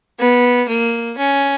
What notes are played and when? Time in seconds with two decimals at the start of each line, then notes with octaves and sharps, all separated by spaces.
0.19 B3
0.69 A#3
1.18 C#4